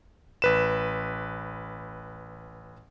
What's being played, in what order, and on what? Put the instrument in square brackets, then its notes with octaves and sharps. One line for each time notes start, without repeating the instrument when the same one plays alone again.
[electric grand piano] A1 B4 E7